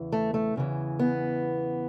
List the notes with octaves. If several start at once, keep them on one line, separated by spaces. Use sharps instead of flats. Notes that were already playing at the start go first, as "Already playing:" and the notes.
Already playing: E2 C#3 E3
A3
A3
E2 C#3 E3
B3